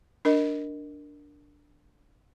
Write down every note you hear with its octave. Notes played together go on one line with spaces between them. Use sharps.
D4 A#4 D#5